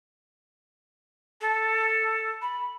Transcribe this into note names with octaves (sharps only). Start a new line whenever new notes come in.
A4
B5